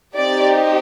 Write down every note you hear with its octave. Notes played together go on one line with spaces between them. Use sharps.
C4 D#4 G4 D5